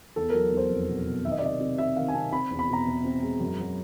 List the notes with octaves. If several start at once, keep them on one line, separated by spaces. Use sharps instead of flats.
E2 A4
A#4
F#3
E2
C5
F1
B2
B2
D#3 E5
D#5
D5
C3 D#5
C3
C3 E5
D#3 F5
G#5
C3 A5
C4 B5
E2
B5
B2 A#5
E2
C4
G#3
F#2
F#3